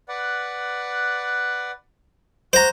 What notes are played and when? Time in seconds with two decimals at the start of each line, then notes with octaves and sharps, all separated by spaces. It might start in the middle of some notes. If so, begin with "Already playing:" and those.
0.08 B4 D5 F#5
2.53 F#4 C5 A#5